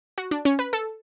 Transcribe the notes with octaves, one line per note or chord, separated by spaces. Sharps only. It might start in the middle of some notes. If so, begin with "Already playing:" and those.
F#4
D4
C#4
B4
A4